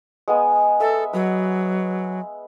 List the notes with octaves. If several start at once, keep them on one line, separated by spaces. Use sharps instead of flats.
G#3 B3 G#5
A4 E5
F#3 B4